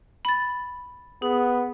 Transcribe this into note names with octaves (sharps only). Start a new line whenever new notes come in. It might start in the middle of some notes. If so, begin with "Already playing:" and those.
B5 A6
B3 G#4